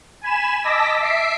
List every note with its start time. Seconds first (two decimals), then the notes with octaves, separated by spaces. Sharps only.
0.22 G#5 B5 E7
0.63 D#5 A5 D6 E6 A#6 B6
1.00 E5 B6 C7 D7